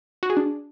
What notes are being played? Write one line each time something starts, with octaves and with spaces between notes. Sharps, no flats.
F#4
G#4
D4